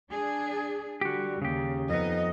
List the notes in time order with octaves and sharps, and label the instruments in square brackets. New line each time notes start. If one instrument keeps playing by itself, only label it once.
[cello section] D4 G#4
[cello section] D3 G3 [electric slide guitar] F#4 G4
[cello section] D#2 [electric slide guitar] C#3 G4
[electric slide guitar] F2 B3 [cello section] D#4 D#5